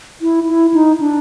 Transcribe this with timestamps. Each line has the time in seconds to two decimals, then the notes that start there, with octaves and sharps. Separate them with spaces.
0.22 E4
0.48 E4
0.74 D#4
1.00 D4